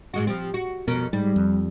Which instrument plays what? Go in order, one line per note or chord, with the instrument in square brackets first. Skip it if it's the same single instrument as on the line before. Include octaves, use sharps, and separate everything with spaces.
[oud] G#2 G#3 F#4
F3 G3 C4
F#4
[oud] F2 C#4 A#4 [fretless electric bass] B2
[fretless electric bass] G#2 [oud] G3
[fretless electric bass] F2